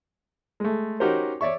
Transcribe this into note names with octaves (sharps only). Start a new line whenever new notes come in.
G#3 A3
C#4 D#4 F#4 G4 A#4 C5
C#5 D5 E5 C#6